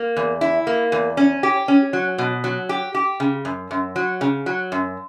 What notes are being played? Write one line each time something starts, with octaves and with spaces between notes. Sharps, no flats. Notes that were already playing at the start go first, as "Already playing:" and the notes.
Already playing: A#3
E2
E4
A#3
E2
C#4
G4
C#4
F#3
B2
F#3
G4
G4
C#3
F#2
F#2
F#3
C#3
F#3
F#2